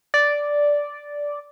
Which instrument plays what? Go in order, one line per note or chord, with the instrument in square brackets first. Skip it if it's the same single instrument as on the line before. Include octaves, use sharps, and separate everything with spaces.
[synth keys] D5